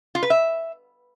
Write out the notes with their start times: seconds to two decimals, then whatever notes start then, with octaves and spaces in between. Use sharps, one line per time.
0.15 F4
0.23 B4
0.30 E5